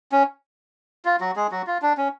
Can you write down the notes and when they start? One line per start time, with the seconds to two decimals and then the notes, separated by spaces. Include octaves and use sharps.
0.12 C#4
1.05 F4
1.21 F#3 F#4
1.36 G#3 G#4
1.51 F#3 F#4
1.67 F4
1.82 D4
1.97 C#4